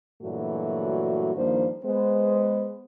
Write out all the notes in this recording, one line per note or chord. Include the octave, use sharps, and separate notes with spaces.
G2 A#2 E3 F#3 A3 F#4
G2 D#3 F3 A#3 D4 C5
G#3 B3 C5